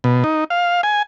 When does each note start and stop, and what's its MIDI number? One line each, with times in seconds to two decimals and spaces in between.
0.04 0.24 47
0.24 0.44 63
0.50 0.81 77
0.83 1.02 80